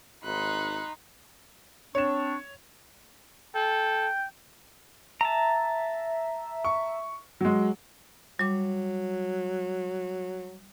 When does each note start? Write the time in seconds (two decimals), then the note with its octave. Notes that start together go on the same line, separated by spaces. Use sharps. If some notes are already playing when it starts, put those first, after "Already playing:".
0.24 G#1 D#4 B5 C6 F#6
1.95 C4 D4 C#5 C#6 E7
3.55 A4 G5
5.21 E5 A5 A#5
6.65 C#6
7.41 F#3 G#3
8.39 F#3 G3 D6